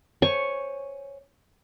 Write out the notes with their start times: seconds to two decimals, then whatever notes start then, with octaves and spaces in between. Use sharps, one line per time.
0.22 C5 C#5 G#5 C#6